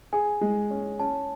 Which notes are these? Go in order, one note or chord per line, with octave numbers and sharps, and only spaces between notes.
G#4 G#5
G#3
C#4
C#4 A5